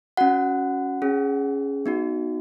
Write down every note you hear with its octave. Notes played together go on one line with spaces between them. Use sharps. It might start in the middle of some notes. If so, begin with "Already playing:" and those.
C#4 F#4 F#5
C#4 G#4
B3 D#4 F#4